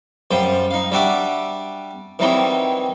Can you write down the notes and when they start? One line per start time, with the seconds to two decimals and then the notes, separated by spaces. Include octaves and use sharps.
0.31 F#2 G3 F4 C5
0.71 D#4 F5
0.92 G3 D4 F#4 E5 F#5 D6
2.19 D#3 E3 F#3 G3 C4 D#4